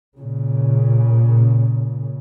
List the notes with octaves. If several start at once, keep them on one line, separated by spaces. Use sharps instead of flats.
A#2 C#3